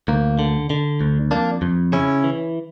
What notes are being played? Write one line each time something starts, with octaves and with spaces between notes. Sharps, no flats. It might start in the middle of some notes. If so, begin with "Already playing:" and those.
D2 A#3
D3
D3
D2
F2 A#3 D4
F2
C#3 C#4 E4
E3